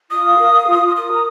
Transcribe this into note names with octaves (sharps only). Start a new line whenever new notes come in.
F4 D#6
F5
A#4
F5
F4
F4
A#4 D#6
A#5